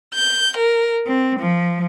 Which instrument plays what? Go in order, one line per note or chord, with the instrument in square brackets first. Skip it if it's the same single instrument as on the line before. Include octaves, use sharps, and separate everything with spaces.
[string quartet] G6
A#4
C4
F3